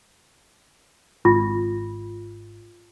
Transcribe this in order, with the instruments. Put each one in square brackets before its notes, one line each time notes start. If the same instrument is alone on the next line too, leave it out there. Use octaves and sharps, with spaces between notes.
[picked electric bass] G#1 [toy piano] F4